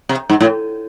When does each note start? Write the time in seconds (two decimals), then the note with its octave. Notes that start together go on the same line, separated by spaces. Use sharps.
0.09 C3
0.30 G#2
0.41 A2